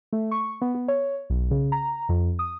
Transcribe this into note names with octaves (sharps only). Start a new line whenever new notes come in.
A3
C#6
B3
B3
C#5
B1
C#3
A#5
F2
D#6